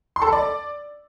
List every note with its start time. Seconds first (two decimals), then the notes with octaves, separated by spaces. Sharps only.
0.16 C6
0.22 A4
0.27 B5
0.33 D5